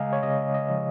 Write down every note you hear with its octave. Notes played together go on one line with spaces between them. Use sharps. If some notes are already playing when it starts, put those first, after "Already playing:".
Already playing: C#3 G#3 D#5 F5 G#5 A#5
C#5
C#3 D#5
D#5
F3